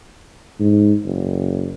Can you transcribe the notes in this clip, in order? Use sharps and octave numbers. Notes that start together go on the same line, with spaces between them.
G#2
F#1